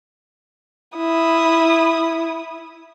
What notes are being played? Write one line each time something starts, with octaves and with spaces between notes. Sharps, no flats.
E4 D#6